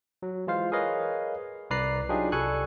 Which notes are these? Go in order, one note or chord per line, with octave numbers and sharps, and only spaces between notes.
F#3
E3 G#3 F4 C5 F5
G#4 A#4 B4 C#5 D#5 F5
C2 B4 D5 A#5 F#6 C7
F#3 D4 D#4 F4 G4 G#4
C2 G3 A4 G#5 C#6 F#6